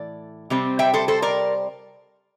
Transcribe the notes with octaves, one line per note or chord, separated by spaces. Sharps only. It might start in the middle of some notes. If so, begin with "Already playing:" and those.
Already playing: A2 E3 A3 D5
C3 G3 C4
E5 G5
A4 C5
A4 C5
A#4 D5